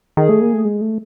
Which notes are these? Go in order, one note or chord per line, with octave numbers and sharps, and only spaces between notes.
D#3 G#4
A3
A#3
A3
G#3
A3